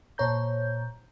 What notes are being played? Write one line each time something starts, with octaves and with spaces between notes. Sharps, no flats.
A#2 C5 C#5 A#5 G6